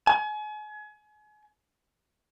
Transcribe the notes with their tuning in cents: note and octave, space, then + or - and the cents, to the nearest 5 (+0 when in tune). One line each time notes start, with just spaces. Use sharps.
G#5 +35